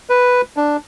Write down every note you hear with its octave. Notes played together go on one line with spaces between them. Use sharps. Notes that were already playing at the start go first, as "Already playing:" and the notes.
B4
D4